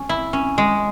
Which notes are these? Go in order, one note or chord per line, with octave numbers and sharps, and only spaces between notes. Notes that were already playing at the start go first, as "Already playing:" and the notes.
Already playing: C#4
E4
C#4
G#3